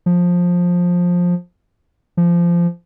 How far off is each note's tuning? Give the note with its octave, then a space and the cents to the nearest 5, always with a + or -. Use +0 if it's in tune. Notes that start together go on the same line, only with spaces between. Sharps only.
F3 +15
F3 -20